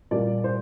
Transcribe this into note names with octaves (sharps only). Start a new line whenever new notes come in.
A#2 G3 A#3 D5
C5